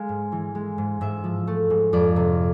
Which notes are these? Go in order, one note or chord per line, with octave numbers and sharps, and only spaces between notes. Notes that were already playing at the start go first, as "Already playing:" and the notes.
Already playing: G#3 F5
G#2
E3
G#3
G#2
G#2 E5
F3
A3
G#2
F2 D5
C3